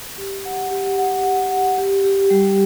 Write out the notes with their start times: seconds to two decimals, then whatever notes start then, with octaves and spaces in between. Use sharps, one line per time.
0.18 G4
0.45 F#5
0.71 G4
0.98 F#5
1.24 F#5
1.51 F#5
1.78 G4
2.04 G4
2.30 G3